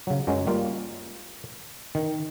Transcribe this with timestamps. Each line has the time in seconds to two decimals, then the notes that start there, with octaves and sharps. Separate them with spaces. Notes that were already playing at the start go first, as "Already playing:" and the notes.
0.07 C#3 F#3
0.27 F#2 F#3 G#3 C#4
0.47 G3 A#3 F4
1.95 D#3